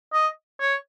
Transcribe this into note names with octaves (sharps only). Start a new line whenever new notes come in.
D#5
C#5